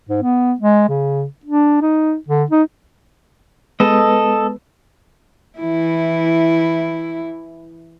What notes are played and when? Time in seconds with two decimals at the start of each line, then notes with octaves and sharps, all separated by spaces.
0.09 G#2
0.22 B3
0.60 G#3
0.89 C#3
1.46 D4
1.81 D#4
2.29 D3
2.51 D#4
3.80 G#3 B3 A4 B4 D#5
5.59 E3 E4